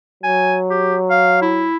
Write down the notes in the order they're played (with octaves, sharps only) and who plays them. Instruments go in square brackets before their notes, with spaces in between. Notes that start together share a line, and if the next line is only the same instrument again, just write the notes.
[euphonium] F#3 [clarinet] G#5
[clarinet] G4
F5
E4